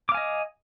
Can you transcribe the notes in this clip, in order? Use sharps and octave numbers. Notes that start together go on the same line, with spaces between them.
D#5 F5 G#5 D6